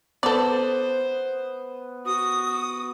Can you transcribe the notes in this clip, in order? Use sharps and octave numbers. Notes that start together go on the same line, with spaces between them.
B3 A4 C5 D5
F#4 D#6